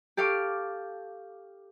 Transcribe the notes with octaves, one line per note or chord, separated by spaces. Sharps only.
G4 A4 F5 C#6 D6